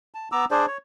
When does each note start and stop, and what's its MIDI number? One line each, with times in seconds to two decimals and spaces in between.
0.14 0.29 81
0.32 0.45 59
0.32 0.45 82
0.32 0.45 86
0.32 0.45 88
0.51 0.66 62
0.51 0.66 68
0.51 0.66 72
0.51 0.66 74
0.67 0.78 73